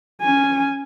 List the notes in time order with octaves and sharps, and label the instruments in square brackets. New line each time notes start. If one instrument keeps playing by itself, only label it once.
[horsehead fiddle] C#4 G#5